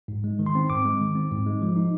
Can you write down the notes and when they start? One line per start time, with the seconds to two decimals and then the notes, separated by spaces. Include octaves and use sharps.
0.08 G#2
0.24 G#3
0.39 D#3
0.46 C6
0.55 C4
0.69 G#2 D6
0.85 G#3
1.01 D#3
1.15 C4
1.31 G#2
1.46 G#3
1.62 F3
1.76 D#4